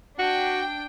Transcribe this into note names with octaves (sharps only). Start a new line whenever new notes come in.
D4 F#4 G5